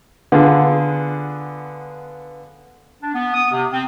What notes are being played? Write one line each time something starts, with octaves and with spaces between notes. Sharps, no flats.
D3 B3 F4 G#4
D4
B3
D#6
C3
C4